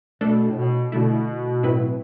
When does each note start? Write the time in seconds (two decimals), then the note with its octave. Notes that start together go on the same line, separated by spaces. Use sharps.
0.21 B2 A3 D4 A4
0.49 A2
0.56 B2
0.92 B2 D3 A3 E4
1.63 A2 F#3 C4 E4 B4